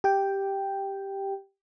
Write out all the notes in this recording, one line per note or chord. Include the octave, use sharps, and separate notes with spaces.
G4 G5